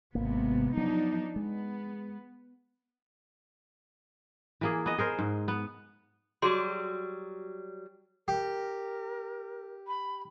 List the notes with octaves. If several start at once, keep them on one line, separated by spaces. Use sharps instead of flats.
G#1 C3 G#3 A#3 B3
F3 F#3 B3 D4 D#4
G#3 B3
E3 A#3 G#4
B3 D#5
G#4 A#4 C5
G#2
B3
F#3 G3 F#4 G#4 C6
G4 A#4
B5